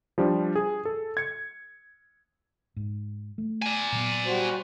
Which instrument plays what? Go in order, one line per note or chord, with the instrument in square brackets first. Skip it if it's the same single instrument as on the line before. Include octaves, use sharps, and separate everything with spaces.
[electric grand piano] F3 G3 D4
G#4
A4
G#6 C#7
[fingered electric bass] G#2
A3
[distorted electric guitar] D5 G#5
[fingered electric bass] A#2 F#3 B3
[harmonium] G3 F#4 C5